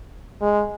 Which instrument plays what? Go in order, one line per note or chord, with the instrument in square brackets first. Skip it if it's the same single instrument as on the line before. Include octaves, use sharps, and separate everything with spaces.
[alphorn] G#3